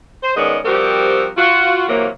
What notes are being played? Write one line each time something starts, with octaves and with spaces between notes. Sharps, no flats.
C5
D#3 G#3 B3 C#4 D5 D#5
F3 G3 C4 F#4 G4 A#4
F4 F#4
C3 E3 F#3 A#3